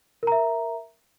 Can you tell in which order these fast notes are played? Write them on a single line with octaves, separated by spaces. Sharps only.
A#4 A#5 E5